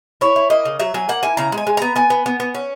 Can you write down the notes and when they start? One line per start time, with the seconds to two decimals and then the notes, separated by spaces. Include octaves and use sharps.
0.21 E4 C#5
0.36 E4
0.50 A#3 D#5
0.65 C#3
0.80 F#3 E5
0.94 F#3 G#5
1.09 A#3 F#5
1.23 E4 G#5
1.37 C#3 A#5
1.52 G#3
1.57 G#5
1.67 G#3
1.77 B3 A#5
1.96 B3 G#5
2.10 B3
2.26 B3
2.40 B3
2.55 C#4